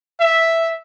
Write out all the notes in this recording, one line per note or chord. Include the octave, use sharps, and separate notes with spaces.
E5